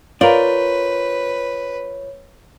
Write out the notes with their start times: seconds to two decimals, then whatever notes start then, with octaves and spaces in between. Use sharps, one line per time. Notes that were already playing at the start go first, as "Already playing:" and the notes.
0.21 F4 A#4 B4 C#5 D5